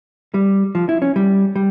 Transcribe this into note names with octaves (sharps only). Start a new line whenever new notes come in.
G3
F3
E4
C#4
G3
G3